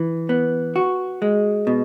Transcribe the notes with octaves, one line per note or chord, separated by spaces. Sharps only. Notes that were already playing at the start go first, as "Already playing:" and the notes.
Already playing: E3
B3
F#4
G#3
B2